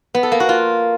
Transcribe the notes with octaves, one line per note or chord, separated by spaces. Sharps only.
B3
A4
A#3
F#4
F4